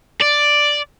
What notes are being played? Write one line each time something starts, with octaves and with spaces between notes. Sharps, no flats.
D5